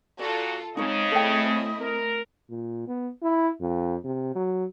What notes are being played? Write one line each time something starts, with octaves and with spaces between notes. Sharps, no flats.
A#2 F4 F#4 A4 D5
C#3 G#3 C4 D#4 C#5 D#5
A3 C4 E4 A4 G5
A#4
A#2
B3
E4
F2
C3
F#3